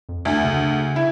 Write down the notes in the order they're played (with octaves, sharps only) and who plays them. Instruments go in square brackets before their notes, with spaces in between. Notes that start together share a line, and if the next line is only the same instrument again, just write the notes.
[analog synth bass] F2
[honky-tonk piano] D2
[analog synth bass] C#3
[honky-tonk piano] E4